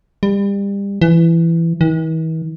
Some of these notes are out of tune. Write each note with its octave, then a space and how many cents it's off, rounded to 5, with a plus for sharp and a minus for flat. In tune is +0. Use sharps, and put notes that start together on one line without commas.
G3 +30
E3 +15
E3 -45